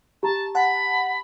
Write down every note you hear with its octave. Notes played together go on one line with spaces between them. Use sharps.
G4 A5 A#5
F#5 A5 B5